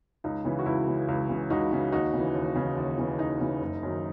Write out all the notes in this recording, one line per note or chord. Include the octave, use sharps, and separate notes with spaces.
C#2 D#4
C#3 E3
F#4
C#2 E4
C#3 E3
C#2
C#3 E3
C#2 D#4 F#4
C#3 E3
D#2 D#4 F#4
C#3 E3
D#2
C#3 E3
D#2
C#3 E3
D#2 D#4
C#3 E3
F#1
F#2 D#3